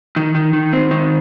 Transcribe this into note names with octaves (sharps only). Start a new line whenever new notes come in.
D#3
D#3
D#3
C4
D#3